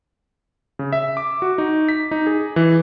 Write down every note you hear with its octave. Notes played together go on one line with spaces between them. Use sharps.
C#3
E5
D6
F#4
D#4
B6
D#4
G#4
E3